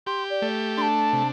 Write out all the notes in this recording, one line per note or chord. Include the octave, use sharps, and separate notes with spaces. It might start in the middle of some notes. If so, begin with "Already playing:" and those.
G4 C6
D5
A3
D4 A5 C6
C3